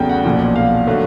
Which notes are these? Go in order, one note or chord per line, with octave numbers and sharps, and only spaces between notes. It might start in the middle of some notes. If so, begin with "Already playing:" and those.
Already playing: E2 C#3 F#3 A3 G5
F#5
B1 A#2 F3
F5
D3 F#3 A3